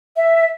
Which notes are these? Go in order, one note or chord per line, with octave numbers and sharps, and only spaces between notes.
E5